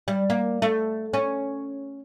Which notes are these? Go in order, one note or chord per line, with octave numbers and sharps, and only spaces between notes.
G3
A#3
A3
C#4